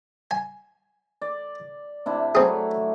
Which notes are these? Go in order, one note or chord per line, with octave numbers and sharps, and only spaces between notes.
G#5
D5
C3 D4 E4
F#3 A3 C4 E4 G#4